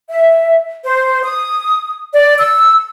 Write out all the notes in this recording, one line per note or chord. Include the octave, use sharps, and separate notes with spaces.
E5
C5
D#6
D5
E6